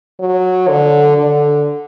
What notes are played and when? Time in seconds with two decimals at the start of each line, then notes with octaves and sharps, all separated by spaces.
0.20 F#3
0.69 D3
1.18 D3